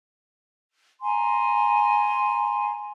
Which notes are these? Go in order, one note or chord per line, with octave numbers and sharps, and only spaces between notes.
G#5 A#5 C6